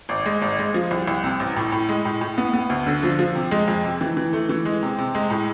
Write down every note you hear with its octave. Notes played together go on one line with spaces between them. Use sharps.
G#1
G#3
G#1
G#3
F3
C2
C2
C3
A1
A2
A2
G#3
A2
A2
B3
B3
D2
D3
F3
F3
C3
G#3
F2
C3
E3
E3
A3
E3
G#3
C3
C3
G#3
A2